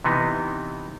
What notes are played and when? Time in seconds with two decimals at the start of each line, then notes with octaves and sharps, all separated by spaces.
0.04 C3 E3 B3 D#4